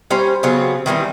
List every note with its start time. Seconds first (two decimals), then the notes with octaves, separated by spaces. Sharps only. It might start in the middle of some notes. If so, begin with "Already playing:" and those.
0.11 G3 C#4 C5 A#5
0.43 C#3 F#3 B3 C4
0.86 D#3 E3 G3 C4